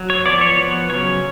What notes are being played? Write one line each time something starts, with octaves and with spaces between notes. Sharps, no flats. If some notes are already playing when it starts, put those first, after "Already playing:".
Already playing: F#3
C#5
F3 B3 D5
C#5
F3 B3
C#3 F#3 C#4 C#5